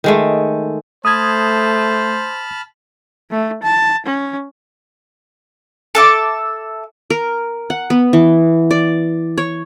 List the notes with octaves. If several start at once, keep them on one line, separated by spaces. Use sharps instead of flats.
D#3 G#3 A3
A3 C5 A5 B5 D#6 F6 G#6
A3
A5
C#4
A4 E5 D6
A#4
F#5
B3
E3
D5
C#5